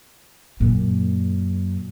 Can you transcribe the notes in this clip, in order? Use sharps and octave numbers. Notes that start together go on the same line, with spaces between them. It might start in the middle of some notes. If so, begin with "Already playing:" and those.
F#2 A#2